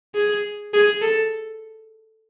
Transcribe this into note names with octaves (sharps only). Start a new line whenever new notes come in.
G#4
G#4
A4